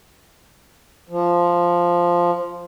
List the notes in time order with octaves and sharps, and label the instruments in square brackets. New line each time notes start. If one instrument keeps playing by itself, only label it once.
[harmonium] F3